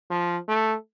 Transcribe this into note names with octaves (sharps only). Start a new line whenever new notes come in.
F3
A3